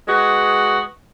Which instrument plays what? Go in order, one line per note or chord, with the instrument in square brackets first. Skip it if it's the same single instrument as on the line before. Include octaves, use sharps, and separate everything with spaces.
[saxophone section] G#3 B3 F#4